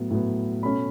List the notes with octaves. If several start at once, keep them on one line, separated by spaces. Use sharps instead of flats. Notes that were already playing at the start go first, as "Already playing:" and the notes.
Already playing: A2 F#3 B3
A2 F#3 B3
B2 A3 C#4 B5